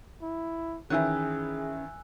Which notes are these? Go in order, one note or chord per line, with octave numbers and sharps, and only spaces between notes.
E4
D#3 E3 C#4 E4 G#4 G#5 E6 F#6